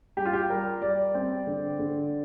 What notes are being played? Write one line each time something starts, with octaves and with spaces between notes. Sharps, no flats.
G3 G4
F4
G4
G3 A#4
G3 D5
C4
D3
D3